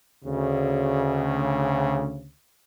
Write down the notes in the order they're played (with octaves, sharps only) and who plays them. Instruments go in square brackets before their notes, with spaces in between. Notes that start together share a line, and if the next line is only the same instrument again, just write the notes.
[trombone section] D2 C#3